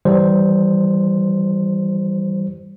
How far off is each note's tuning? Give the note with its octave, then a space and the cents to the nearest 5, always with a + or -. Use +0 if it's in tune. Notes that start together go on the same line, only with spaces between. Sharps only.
E3 -10 G3 -15 C5 +0